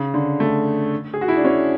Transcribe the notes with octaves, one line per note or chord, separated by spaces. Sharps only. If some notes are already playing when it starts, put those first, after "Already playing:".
Already playing: C#3
D3
A3
G#4
F#4
E4
D4
C#4